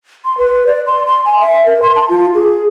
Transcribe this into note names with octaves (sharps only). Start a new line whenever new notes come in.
C6
B4
D5
C6
C6
G#5
E5
A#4
C6
A5
F4
G#4